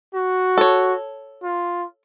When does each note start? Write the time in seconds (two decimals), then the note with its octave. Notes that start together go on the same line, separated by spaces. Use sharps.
0.14 F#4
0.58 A4 C#5
1.43 F4